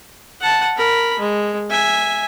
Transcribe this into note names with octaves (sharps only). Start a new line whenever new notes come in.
F#5 A5
A#4 B5
G#3
E5 G#5